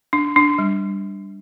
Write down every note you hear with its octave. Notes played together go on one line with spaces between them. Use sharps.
D4
D4
G3